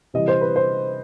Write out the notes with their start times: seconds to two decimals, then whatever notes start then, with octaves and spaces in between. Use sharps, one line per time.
0.14 C3 E3 G3 D#5
0.28 C5
0.41 B4
0.56 C5